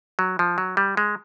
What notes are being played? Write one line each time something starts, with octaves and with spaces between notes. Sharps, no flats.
F#3
F3
F#3
G3
G#3